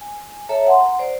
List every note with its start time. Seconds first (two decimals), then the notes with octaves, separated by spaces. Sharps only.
0.01 G#5
0.49 A4 C#5 E5 A5 A#5
0.67 F#5 A#5 C6
0.99 C5 D5